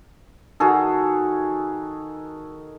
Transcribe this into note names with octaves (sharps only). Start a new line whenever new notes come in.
D#3 F#4 G#4 A4